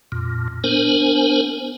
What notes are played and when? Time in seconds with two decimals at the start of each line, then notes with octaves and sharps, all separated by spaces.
0.12 F2 A#2
0.64 B3 D4 A#4 C5 G#5